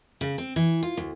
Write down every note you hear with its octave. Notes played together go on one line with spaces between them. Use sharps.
C#3
C4
E3
F4
D2